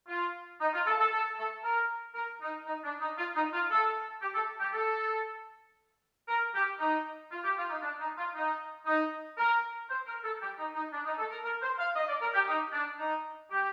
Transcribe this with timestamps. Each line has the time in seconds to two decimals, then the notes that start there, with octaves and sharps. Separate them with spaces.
0.08 F4
0.61 D#4
0.74 F4
0.87 A4
1.00 A4
1.12 A4
1.38 A4
1.64 A#4
2.15 A#4
2.41 D#4
2.66 D#4
2.84 D4
3.01 D#4
3.18 F4
3.35 D#4
3.53 F4
3.71 A4
4.21 G4
4.35 A4
4.60 G4
4.73 A4
6.28 A#4
6.54 G4
6.79 D#4
7.31 F4
7.44 G4
7.58 F4
7.70 D#4
7.82 D4
7.99 D#4
8.17 F4
8.35 D#4
8.86 D#4
9.38 A#4
9.90 C5
10.07 A#4
10.24 A4
10.41 G4
10.58 D#4
10.75 D#4
10.93 D4
11.06 D#4
11.18 A4
11.31 A#4
11.44 A#4
11.62 C5
11.79 F5
11.96 D#5
12.08 D5
12.21 A#4
12.34 G4
12.48 D#4
12.73 D4
12.98 D#4
13.51 G4